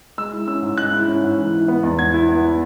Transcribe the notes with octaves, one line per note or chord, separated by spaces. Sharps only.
G#3 E6
E4
C#4 E6
G#2
G#3 F#6
E4
C#4
G#2
E3
E4
B3
E2
E3 G#6
E4
B3